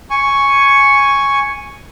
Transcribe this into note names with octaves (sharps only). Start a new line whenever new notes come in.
G#5 C#6